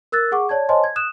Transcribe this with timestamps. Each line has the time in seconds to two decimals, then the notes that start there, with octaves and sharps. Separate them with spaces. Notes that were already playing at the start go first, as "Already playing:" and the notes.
0.12 A#4 E6 F#6 A6
0.32 G#4 F#5 C#6 D6
0.49 C#5 D5 A5 G#6
0.69 C5 C#5 D#5 G#5 A5 C6
0.84 G#6
0.96 D#6 F#6 E7